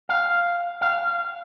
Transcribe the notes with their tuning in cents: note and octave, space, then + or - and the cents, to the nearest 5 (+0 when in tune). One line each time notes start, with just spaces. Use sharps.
F5 +0
F5 -20